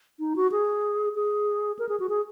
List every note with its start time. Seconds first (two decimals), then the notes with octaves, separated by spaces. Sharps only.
0.19 D#4
0.36 F#4
0.52 G#4
1.15 G#4
1.79 A#4
1.89 G#4
2.00 F#4
2.09 G#4